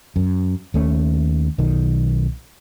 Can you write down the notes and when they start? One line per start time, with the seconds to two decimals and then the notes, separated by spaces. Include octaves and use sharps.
0.16 F#2
0.74 D#2 A3 C#4
1.58 B1 D#3